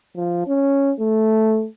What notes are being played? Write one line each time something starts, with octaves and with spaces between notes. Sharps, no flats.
F3
C#4
A3